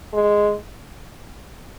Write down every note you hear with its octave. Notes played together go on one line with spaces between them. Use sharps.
G#3